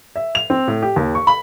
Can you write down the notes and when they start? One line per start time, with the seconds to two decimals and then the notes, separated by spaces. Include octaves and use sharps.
0.16 E5
0.35 F7
0.50 C4
0.68 A2
0.82 G4
0.96 D#2
1.15 C#6
1.27 B5